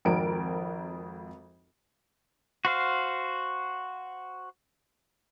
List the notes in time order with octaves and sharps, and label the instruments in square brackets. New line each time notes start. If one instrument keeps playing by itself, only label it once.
[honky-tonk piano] G#1 F2 A#4 D7
[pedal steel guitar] F#4 C5 F5